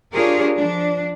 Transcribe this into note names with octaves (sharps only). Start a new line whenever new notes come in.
D4 F4 G4 G#4 A#4 C#5
F3 D4